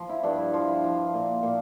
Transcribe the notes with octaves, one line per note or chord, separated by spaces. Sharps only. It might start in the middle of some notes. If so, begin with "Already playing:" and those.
Already playing: F3
E4
G2 D4
E4
F3 F4
E4
F3 F4
A#2
A#2